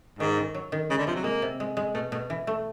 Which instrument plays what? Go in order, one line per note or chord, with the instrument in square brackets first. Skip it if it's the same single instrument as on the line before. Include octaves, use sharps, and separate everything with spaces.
[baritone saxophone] G#2 [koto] D#3
[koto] D#3
F#3
D#3
[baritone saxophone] C#3 [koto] G#3
[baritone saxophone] D3
[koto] C3 [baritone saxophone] F3
[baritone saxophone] F#3
[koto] G#3 [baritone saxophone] A#3
[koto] C3
G#3
G#3
[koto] B2 [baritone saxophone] A3
[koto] B2 [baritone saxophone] A3
[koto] E3
A3